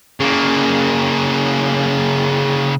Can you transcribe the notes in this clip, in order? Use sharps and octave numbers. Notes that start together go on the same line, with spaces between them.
C#3 A#3